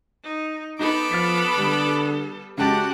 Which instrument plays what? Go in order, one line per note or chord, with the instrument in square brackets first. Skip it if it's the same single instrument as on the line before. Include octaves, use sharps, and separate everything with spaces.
[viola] D#4
[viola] B3 A4 [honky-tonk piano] D#4 [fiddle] B5 D6
[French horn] F3 [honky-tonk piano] F6 A6 B6
[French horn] D3 [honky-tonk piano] G3
[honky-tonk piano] C#3 A5 A6 [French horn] G#3 [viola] F#4 F#5 [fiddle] G4